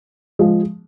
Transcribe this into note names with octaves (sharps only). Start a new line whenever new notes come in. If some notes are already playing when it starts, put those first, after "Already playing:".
F3 G#3